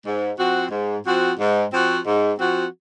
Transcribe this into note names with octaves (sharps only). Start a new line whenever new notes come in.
G#2
F3 C4 F#4
G#2
F3 C4 F#4
G#2
F3 C4 F#4
G#2
F3 C4 F#4